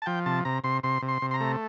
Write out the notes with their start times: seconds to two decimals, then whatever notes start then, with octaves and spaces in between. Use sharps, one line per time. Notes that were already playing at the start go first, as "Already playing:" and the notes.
0.02 A5
0.06 F3 G5
0.26 C3 A5
0.45 C3 A#5
0.64 C3 C6
0.83 C3 C6
1.02 C3
1.08 C6
1.22 C3
1.31 C6
1.34 A#5
1.41 A3